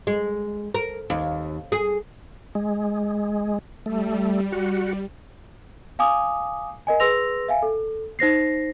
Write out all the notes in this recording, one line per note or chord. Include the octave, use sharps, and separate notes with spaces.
G#3
A#4
D#2
G#4
G#3
G3 A3
F#4
F5 G#5 D6 D#6
A#4 D#5 G#5
G#4 B4 C6 E6 A#6 F7
E5 F5 G#5
A4
D#4 C5 A#6 C7